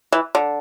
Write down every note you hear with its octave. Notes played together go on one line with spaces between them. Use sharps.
E3
D3